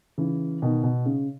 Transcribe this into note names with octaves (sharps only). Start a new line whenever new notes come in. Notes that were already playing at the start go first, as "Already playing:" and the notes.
C#3 E3
B2 D#3
B2
C#3